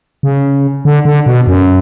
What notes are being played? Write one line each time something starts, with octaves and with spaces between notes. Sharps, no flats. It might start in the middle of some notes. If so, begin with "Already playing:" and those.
C#3
D3
D3
B2
F#2